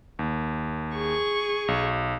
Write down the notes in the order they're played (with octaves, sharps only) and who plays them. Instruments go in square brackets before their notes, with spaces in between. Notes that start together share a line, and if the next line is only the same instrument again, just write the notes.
[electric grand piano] D#2
[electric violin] G#4 C#6
[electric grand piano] B1